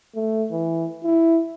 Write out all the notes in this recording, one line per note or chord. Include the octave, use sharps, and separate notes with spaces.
A3
E3
E4